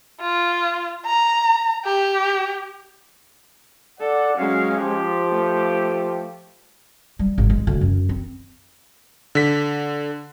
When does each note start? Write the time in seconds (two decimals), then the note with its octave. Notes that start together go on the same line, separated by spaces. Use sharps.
0.21 F4
1.06 A#5
1.85 G4
4.00 A4 D5 F#5
4.37 F#3 G#3 C#4 F5
4.77 F3 G4
5.29 A3
7.19 G3
7.38 G#1
7.50 G#3
7.67 D2
7.81 F#2
8.09 C4
9.35 D3 B6